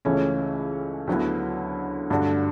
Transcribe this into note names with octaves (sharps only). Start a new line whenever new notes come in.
C#2 C#3 E3 A3 C#4
D2 D3 F#3 B3 E4
G2 D3 A3 D4 F#4